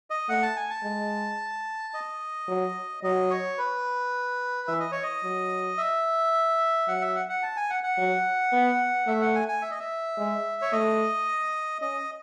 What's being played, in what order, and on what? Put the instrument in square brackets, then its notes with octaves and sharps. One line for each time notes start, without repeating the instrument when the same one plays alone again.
[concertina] D#5
[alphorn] A3 [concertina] F#5
[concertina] A5
G#5
A5
[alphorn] G#3
[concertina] D#5
[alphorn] F#3
[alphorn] F#3 [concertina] D#5
[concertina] C#5
B4
[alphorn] E3 [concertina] E5
[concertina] D#5
C#5
D#5
[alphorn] F#3
[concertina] E5
[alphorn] F#3 [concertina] F#5
[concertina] E5
F#5
F#5
A5
G#5
F#5
F#5
[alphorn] F#3
B3
[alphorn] A3 [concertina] E5
[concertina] F#5
G#5
G#5
E5
D#5
E5
[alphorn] G#3
[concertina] C#5
[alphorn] A3 [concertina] D#5
[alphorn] C#4 [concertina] D#5